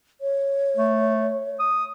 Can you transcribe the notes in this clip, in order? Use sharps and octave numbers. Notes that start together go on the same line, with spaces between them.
C#5
A3
D#6